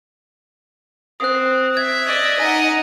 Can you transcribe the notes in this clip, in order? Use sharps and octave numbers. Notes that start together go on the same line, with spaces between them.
C4 D#6 F#6
E5 G#6
D5 D#5
D#4 D#5 F#5 G#5